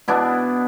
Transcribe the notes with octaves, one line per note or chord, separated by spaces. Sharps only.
B2 B3 D4 E4